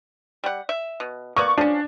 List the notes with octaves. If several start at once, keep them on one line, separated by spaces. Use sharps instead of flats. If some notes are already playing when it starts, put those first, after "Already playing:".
G3 F#5
E5
B2
A#3 B3 D5 C#6
F3 C#4 D4